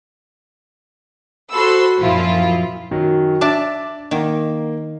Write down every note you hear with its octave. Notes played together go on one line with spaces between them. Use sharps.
F#4 A4 C5 B5 C6 E6
F#2 A#2 F3 E4 F4
F#2 D#3 F#3
D4 D5 E5 A5 D6
D#3 A#3